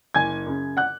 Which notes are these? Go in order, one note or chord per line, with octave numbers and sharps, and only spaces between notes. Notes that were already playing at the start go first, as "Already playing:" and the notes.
F#1 G#5 G#6
F#2 C#3
F#5 F#6